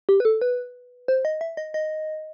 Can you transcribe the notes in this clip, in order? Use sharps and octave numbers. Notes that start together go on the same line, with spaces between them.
G4
B4
A4
B4
C5
D#5
E5
D#5
D#5